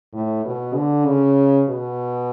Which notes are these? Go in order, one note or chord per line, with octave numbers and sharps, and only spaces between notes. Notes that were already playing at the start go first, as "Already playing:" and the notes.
A2
B2
D3
C#3
B2